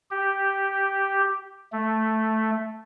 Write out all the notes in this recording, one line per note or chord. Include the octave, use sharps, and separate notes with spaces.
G4
A3